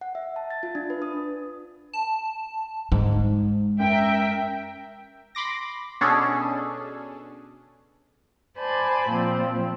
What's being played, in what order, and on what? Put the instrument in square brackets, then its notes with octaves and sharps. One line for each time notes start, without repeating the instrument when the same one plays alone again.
[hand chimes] F#5
E5
A5
A6
F4
D4
B4
D#6
[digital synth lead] A5
[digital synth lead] G#2 [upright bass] G#3
[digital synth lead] F#2 [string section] A#4 E5 G5
[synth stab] B5 C6 D6 A#6
B2 C#4 D4 G#4 A4
[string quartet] C5 D5 G#5 A5 B5
A#2 F3 C4